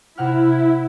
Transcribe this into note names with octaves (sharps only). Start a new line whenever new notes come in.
C3 E4 F#5 F6